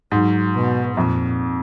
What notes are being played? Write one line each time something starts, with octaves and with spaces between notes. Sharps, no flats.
G#2 F#3
B2
F2 A#2